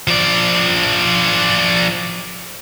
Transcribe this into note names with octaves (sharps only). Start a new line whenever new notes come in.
F3 D5